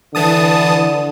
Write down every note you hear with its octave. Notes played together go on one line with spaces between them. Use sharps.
D3 E3 A5 D#6